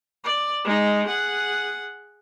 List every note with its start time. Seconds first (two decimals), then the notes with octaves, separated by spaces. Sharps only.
0.25 D5
0.64 G#3 D#4
1.07 G#4 F#5